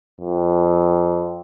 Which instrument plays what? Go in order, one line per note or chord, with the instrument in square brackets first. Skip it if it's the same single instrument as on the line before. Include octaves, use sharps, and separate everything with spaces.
[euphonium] F2